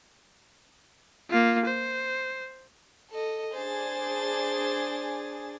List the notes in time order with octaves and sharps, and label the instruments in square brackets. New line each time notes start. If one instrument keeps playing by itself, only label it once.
[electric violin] A#3 F4
C5
[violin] A4 D#5
[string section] D4 G#4 [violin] C5 A6